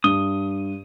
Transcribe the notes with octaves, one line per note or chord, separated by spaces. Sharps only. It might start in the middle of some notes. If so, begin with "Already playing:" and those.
G2 D#6 G7